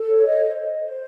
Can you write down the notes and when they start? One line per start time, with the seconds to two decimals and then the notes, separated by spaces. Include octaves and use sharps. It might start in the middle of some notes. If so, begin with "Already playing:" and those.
Already playing: A4
0.08 C#5
0.26 D#5
0.45 C5
0.64 D#5
0.82 C5